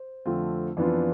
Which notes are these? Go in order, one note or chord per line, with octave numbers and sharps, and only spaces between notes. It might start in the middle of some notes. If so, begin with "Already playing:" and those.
Already playing: C5
F2 D3 A3 C4 F4
F2 E3 B3 D4 F4 D5